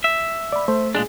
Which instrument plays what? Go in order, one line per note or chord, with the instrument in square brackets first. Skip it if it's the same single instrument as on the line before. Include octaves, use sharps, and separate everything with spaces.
[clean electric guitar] E5
[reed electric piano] D5 B5
[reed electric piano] A3 [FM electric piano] C5
[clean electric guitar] A#2 G#3 D4 [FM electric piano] G#4